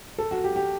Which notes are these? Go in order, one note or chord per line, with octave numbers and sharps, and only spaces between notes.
A4
F#4
G4
G4